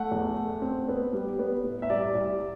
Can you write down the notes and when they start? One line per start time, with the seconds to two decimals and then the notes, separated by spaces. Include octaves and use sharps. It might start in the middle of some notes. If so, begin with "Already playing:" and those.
Already playing: A3 F#5
0.11 E2
0.36 A3
0.62 C4
0.88 B3
1.13 G3
1.39 B3
1.64 A2
1.82 E5
1.90 C2 D5
2.15 C2